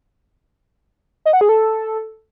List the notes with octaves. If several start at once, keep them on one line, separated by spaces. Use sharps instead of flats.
D#5
F#5
G#4
A4